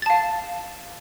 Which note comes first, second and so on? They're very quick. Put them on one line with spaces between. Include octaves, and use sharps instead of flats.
A6 A5 F5